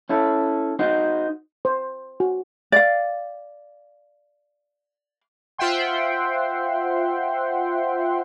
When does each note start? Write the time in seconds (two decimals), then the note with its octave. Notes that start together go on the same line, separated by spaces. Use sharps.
0.09 C#4 E4 A4
0.79 D#4 F#4 C5
1.65 C5
2.20 F#4
2.72 D5 F5
5.58 F4 C5 E5 F#5 G5 C6